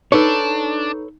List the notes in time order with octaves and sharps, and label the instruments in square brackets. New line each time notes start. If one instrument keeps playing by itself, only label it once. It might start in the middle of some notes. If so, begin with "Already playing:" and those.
[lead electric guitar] D4 [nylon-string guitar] D#4 [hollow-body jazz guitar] A4 B4 C#5